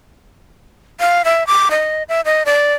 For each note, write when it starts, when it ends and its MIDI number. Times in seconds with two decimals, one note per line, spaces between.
1.00 1.22 77
1.25 1.46 76
1.47 1.69 86
1.71 2.03 75
2.09 2.21 76
2.25 2.43 75
2.46 2.75 74